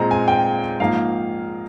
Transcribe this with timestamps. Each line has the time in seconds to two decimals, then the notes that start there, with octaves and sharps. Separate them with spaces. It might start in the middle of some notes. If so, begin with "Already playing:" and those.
Already playing: A#2 G#3 C4 A#5
0.11 G#5
0.28 G5
0.80 G#2 F3 A#3 F5